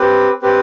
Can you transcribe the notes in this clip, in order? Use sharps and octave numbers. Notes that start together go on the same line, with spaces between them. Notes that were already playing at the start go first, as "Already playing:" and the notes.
Already playing: C4 G4 B4
C4 G4 B4